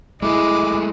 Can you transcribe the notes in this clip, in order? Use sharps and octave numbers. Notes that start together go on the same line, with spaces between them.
G#3 A3 E4 G#4 D#5 D6